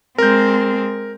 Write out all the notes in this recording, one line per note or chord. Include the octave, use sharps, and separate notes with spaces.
G#3 C4 A#4 G6